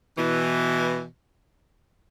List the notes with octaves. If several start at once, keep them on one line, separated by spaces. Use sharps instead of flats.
B2 E3